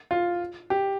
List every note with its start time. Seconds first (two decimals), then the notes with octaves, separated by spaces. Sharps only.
0.11 F4
0.70 G4